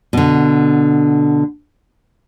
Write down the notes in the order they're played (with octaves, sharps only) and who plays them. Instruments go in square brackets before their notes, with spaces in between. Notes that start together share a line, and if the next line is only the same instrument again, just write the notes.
[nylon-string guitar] B2 D3